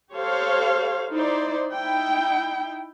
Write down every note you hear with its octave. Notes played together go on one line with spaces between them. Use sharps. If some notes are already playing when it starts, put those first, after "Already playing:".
G4 A4 C5 C#5 F5
D#4 E4 C5 D5
D#4 E4 G5